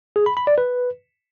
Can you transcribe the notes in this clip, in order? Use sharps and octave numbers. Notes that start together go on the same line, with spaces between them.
G#4
B5
B5
D5
B4